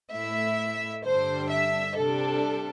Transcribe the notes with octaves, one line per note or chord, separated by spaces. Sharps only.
A2 A3 E4 E5
G2 D3 G3 D4 C5
E5
C3 G3 D4 A4